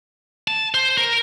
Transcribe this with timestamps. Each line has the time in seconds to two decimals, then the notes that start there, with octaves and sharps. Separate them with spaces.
0.48 A5
0.74 C5
0.98 A#4